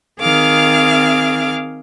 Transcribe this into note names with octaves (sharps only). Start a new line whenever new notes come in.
D#3 C4 G#4 F5 D6 F6